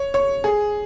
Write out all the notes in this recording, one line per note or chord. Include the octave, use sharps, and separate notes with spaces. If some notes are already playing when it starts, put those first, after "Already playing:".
Already playing: C#5
C#5
G#4